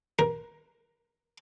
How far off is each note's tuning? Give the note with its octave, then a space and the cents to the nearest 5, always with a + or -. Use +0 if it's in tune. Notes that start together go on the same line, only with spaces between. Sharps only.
A#4 +15